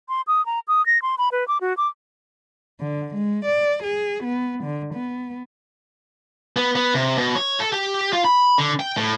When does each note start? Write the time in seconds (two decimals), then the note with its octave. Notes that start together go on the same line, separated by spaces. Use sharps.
0.09 C6
0.27 D#6
0.46 A#5
0.68 D#6
0.86 A#6
1.02 C6
1.18 B5
1.32 B4
1.48 D6
1.61 F#4
1.77 D6
2.80 D3
3.15 G#3
3.45 D5
3.83 G#4
4.24 B3
4.64 D3
4.94 B3
6.56 B3
6.76 B3
6.94 C3
7.18 B2
7.35 C#5
7.60 A4
7.72 G4
8.13 F4
8.25 B5
8.58 D3
8.79 G5
8.97 A2